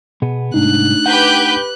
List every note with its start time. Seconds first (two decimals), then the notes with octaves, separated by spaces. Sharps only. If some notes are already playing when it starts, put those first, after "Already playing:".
0.22 B2 B3 G#4
0.54 C2 G#2 A3 D4 D#4 F#6
1.06 G4 B4 F#5 G6